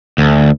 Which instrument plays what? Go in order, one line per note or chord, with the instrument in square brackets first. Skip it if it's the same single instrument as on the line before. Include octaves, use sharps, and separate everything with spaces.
[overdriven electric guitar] D2